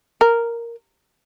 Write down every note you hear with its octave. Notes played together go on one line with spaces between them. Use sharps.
A#4